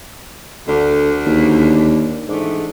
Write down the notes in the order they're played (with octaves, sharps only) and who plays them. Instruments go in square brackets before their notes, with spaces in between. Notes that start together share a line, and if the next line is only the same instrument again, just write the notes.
[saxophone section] D2 D4 [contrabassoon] D3
[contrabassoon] D#2
[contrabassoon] G#2 [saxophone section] E3 A3 D4